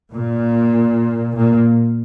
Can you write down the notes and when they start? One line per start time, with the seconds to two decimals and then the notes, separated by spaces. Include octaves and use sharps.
0.13 A#2
1.37 A#2 A#3